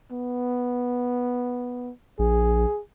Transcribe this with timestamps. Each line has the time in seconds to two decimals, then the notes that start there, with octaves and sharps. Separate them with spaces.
0.12 B3
2.19 A#1 G#4